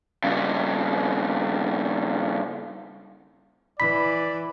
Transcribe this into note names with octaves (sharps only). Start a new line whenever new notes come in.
G2 C#3
E3 D5 B5 B6